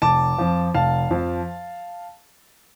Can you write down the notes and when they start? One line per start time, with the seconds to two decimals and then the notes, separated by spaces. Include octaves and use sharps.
0.02 F1 A5 D6
0.38 F2 F3
0.74 F1 F5 A5
1.11 F2 F3